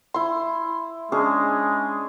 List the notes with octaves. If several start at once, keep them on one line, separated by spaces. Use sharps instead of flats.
E4 C6
G#3 C#4 D4 G#4